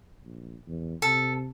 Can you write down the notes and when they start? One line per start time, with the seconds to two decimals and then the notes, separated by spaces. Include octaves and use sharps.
0.23 A#1
0.67 E2
1.02 C3 A4